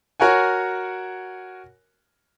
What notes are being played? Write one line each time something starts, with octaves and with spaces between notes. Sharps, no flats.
F#4 A#4 C#5 F#5 G#5